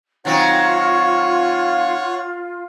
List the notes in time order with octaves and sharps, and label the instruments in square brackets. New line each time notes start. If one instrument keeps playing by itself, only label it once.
[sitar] D#3 F#3 C4 [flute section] F4 [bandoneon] C#5 F#5 C#6